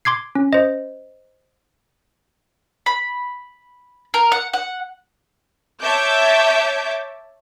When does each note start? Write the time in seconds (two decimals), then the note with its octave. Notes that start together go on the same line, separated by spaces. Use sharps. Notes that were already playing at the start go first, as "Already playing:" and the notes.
0.05 C6 D6 G#6 C7
0.35 C#4
0.53 C5 D#5
2.86 B5
4.14 A#4
4.32 F#5
4.54 F#5
5.82 C#5 E5 A5 D6 G6